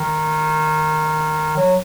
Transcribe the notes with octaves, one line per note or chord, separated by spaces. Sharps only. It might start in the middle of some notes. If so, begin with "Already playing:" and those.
Already playing: D#3
F#3